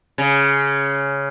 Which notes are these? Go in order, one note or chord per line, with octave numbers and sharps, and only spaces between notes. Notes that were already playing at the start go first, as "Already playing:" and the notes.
C#3